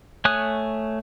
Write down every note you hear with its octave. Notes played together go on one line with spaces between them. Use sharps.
A3 C#5 G#5 D#6 F#6